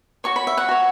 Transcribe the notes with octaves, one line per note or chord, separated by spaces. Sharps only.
F#4 C#5 C#6
B5
E5
F#5
F#4 C#5